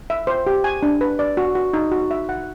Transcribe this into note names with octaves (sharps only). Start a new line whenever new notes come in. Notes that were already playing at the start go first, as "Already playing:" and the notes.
E5
C5
G4
G#5
D4
B4
D5
F#4
F#4
D#4
F#4
E5
F#5